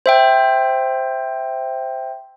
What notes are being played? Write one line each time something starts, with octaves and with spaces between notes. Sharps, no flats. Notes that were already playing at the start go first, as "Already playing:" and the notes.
C5 E5 G5